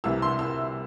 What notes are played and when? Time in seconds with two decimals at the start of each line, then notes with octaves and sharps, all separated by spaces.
0.04 C2 C3 E3 E6
0.22 C6
0.39 E6